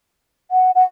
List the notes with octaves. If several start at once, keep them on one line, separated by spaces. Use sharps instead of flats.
F#5
F#5